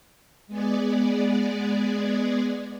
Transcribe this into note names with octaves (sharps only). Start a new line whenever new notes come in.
G#3 B3 G#4 D5